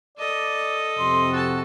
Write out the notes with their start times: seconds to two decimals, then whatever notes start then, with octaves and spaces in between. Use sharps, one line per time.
0.18 A4 D5 D#5
0.99 F2 C3 C6
1.32 F#4 A4 A5